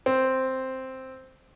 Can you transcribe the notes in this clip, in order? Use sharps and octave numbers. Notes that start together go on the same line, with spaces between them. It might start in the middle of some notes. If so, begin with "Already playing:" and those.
C4